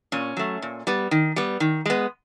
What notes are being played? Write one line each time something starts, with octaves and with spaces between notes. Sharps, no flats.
A#2 C#4
F#3 A3
A#2
G3 B3
D#3
G3 B3
D#3
G#3 B3